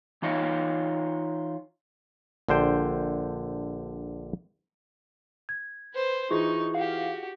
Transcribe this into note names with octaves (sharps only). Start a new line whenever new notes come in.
E3 D#4 F4 C#5 D#5
A#1 D3 C5 G5
G#6
B4 C5
E3 D#4 F4 G#4 C#6
F#4 G4 F5